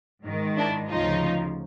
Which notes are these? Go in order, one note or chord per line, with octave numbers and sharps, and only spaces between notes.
G#2 D#3
D4 E4
D2 C#3 F3 D#4 F4